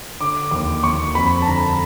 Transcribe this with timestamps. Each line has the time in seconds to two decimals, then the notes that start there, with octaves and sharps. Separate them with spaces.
0.20 D3 D6
0.51 D#2 D6
0.84 D#2 C#6
1.15 F2 B5
1.42 A5
1.47 D3 A#5